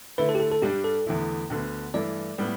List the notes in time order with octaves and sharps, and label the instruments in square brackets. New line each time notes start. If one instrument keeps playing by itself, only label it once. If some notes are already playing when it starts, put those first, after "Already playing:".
[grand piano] D3 A3 E4 [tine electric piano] B4
[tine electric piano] A4
G4
A4
A4
[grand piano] G2 G3 D4 [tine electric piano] G4
[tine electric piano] A4
[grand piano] E2 D3 A3 E4
D2 D3 B3
[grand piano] G2 E3 A3 E4 [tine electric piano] D5
[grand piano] A2 G3 B3